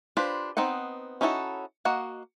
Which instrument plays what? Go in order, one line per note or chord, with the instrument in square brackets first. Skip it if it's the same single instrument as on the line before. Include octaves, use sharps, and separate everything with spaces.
[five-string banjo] D4 F4 G4 B4 C5
B3 C4 D#4 D#5 F#5
C#4 D#4 E4 F#4 A4
A#3 F#4 D#5 F#5